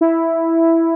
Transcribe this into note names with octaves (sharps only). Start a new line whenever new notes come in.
E4